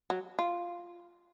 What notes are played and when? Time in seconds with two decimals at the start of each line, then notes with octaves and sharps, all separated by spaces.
0.10 F#3
0.39 F4